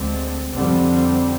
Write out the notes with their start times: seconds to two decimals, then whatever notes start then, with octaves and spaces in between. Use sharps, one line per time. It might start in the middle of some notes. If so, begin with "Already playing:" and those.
Already playing: D2 D3 G#3 C4
0.54 F2 D3 G3 C4